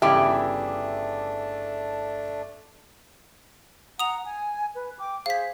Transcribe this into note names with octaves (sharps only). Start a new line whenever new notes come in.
G1 C#3 E3 A3 D4 G4 E5 D6
F#5 A#5 D#6 F7
G#5
B4
G5 D6
G#4 C5 F5 B6